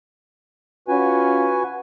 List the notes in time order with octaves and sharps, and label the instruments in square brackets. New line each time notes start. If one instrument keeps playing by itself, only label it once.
[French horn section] C#4 F4 [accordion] F#4 B4 G#5